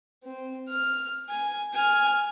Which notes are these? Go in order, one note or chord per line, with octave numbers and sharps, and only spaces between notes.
C4
F6
G#5
G#5 F6